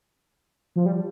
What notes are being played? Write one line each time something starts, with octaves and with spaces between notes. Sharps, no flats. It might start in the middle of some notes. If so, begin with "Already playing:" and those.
F3
G3